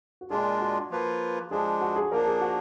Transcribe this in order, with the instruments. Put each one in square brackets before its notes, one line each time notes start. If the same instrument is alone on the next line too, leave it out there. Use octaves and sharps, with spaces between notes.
[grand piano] F#4
[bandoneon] A#2 G#3 D4 F4 [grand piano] G#4
[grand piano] F#4
[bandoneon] F3 A#3 F4 B4
[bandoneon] F3 G#3 D4 [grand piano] G#4
[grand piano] F#4
G#4
[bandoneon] F3 A#3 D4 [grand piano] A#4
[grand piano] G#4
F#4